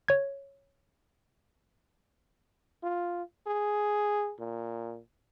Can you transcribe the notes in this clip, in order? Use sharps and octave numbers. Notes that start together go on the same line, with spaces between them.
C#5 G#6
F4
G#4
A#2